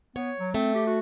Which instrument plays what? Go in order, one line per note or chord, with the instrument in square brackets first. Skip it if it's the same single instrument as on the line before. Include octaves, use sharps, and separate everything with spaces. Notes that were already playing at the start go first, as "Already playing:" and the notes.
[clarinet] B3 [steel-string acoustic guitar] C#5
[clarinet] F#3
[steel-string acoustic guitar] A3 [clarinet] C4
[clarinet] G4
F#4